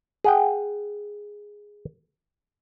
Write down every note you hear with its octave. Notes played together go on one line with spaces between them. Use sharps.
G#4 F#5 G5